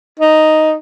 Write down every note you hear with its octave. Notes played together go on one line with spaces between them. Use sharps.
D#4